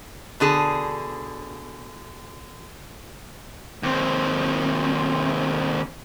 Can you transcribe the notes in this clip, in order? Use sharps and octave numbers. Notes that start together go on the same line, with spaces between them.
B2 D3 G#4 A5
D#2 C4